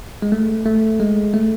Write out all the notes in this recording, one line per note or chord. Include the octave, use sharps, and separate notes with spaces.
G#3
A3
A3
G#3
A3